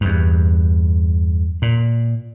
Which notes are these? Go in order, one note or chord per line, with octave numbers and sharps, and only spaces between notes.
E2 G2
A#2